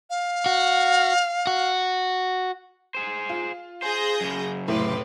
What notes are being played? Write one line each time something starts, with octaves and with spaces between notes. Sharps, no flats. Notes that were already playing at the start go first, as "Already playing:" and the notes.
F5
F#4
F#4
G#4 C5
F4
G#4 C5 G6 A#6
F#2 C#3
F1 A2 E4 B4 C6 D6